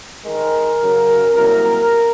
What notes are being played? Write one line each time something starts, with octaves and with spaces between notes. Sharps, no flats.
G#2 D#3 G#3 A#4
F#2 C#3 F#3
C2 C3 F#3 A#3 A#4